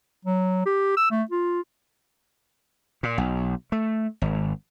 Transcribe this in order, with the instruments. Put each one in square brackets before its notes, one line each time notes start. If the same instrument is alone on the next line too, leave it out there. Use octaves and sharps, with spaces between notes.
[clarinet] F#3
G4
E6
A3
F4
[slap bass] A#2
B1
A3
G#1